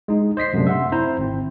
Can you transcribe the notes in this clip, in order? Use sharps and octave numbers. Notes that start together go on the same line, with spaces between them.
G#3 D#4
C5 D#5 B6 C7
F#2 C3 A3 D4
E5 F#5 C6
C4 E4 C5 A#5
G#1 C4